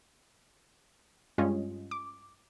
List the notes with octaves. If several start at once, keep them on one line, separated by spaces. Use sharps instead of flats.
G2 G3 G#3 C#4 F4 D#5
D6